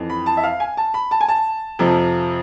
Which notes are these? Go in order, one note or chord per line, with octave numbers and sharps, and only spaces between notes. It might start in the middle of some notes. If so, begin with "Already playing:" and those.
Already playing: F2 E3
B5
A5
E5
F5
G#5
A5
B5
A5
G#5
A5
F2 C3 F3